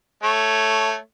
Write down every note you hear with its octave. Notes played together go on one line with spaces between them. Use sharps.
A3 C#5